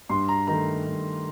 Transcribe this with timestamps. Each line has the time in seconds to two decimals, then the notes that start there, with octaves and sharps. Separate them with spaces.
0.09 G2 C6
0.29 A#5
0.47 D#3 A3 A#5
0.86 G2